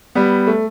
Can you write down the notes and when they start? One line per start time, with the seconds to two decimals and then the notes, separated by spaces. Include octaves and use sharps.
0.15 G3 B3
0.47 A3